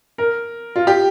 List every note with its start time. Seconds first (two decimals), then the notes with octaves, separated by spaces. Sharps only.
0.18 A#4
0.76 F4
0.87 G4